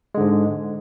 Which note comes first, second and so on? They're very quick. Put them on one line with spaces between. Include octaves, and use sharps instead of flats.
G#3 D3 G#2